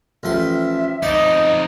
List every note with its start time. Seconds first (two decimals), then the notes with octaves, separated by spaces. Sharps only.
0.23 A1 F3 E5 C6
1.02 F2 D#4 D5 D#5 D6